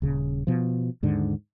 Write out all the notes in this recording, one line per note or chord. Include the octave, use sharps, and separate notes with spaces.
D#1 C#3
B2 F3
D#2 G#2 D3